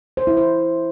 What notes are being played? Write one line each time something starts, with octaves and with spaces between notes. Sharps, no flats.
C5
E4
C5